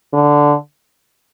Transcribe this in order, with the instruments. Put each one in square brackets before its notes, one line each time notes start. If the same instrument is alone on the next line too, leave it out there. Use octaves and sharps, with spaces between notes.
[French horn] D3